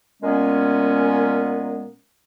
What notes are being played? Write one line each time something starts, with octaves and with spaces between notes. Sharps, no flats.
A#2 G#3 B3 C#4